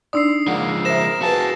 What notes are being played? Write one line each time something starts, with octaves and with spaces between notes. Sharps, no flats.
D4 D#4 D5 D#6 E6 C7
F3 G#3 A#3 F#5
A#4 C5 E5 A#6 E7
F#4 G#4 B4 F5 A5